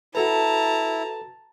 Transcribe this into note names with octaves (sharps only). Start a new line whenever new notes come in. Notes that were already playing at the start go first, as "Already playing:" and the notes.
E4 F#4 A4 B4 A5 A#5